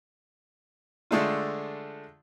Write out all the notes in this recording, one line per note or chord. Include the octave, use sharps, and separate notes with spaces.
D3 G#3 A3 D4 F4